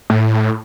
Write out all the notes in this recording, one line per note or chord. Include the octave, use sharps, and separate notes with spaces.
A2